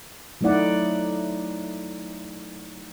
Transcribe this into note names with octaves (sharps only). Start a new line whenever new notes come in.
F#3 A3 D#4 E4 D5 F#5